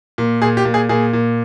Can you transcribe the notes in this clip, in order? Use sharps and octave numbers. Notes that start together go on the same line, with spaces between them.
A#2
A#2 G#4
G4
A#2
G#4
A#2 G#4
A#2